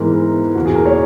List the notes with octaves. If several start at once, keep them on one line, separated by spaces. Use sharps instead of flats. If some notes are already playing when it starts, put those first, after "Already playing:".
Already playing: G#2 E3 G#3 B3 A#4
E2 B2 A#3 F#4
G#4
A#4
C#5